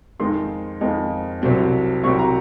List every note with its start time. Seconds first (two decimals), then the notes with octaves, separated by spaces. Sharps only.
0.20 F2 D#3 G#3 D#4 C6
0.81 F2 D#3 G#3 D#4
1.42 C2 C3 F#3 C4
2.04 C2 C3 F#3 C4 C#6
2.19 A#5